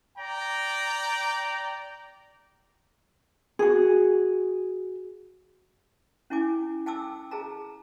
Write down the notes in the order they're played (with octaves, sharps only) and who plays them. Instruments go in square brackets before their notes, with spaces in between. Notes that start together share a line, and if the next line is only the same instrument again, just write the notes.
[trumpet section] D5 G5 A#5
[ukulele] F#4 G#4
[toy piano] C#4 E4 G#5 D6
G5 A5 D6 E6
G#4 A5 A#5